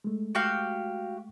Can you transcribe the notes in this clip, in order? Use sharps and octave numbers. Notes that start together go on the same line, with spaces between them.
G#3 A3
F#4 G4 F5